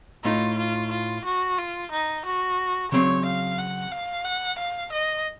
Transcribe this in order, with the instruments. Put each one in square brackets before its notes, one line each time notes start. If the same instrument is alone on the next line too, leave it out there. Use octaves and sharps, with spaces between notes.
[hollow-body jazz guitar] A2 A3 D#4 [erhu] F4
[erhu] F4
F4
F#4
F4
D#4
F#4
[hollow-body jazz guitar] C#3 F#3 C4 [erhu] C#5
[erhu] F5
F#5
F5
F#5
F5
D#5